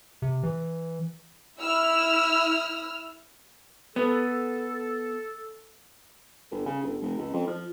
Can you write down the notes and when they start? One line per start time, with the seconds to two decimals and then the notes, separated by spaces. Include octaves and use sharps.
0.22 C3
0.43 E3
1.59 E4 E6 F6
3.96 B3 A4
6.51 G1
6.66 C#3
6.83 G1
7.01 F1
7.18 C#2
7.33 F2
7.47 F3